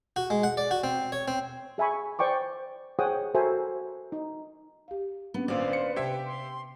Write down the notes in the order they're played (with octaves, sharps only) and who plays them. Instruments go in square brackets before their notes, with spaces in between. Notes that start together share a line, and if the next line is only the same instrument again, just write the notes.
[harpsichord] F#4
G#3
F#5
D5
F#4
C4
C#5
C4
[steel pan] G#4 E5 G#5 B5 C#6
C5 D5 G5 C#6 D6
G#4 C5 C#5 F#5 G5 D#6
F#4 A4 A#4 C5 E5 G#5
D#4
[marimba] G4 F5
[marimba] A#3 C#4 D4 [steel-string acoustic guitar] B3
[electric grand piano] G#1 A#2 [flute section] B4 C5 [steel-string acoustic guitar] D5 F5
[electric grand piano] C#7
[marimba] C3 A5 G#6 [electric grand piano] G4 E5 [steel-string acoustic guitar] G5
[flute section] C6